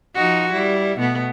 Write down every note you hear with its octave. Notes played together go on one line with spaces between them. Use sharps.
F3 D#4 F#4
G3 E4
B2 A3 B3